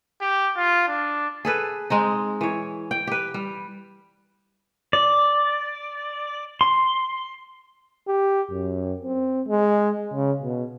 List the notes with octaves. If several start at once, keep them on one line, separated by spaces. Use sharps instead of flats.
G4
F4
D4
G#4 A4 B4
G#3 C4 D#4
E3 C#5
G5
G4 B4
G3
D5
C6
G4
F#2
C4
G#3
C#3
B2